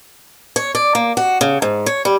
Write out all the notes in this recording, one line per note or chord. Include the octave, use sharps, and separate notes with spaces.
C#5
D5
A#3
F#4
C#3
G#2
C#5
G3